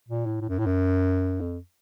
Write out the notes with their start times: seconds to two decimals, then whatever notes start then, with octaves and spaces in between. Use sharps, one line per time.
0.09 A#2
0.26 A2
0.41 A2
0.49 F#2
0.59 A2
0.66 F#2
1.41 F2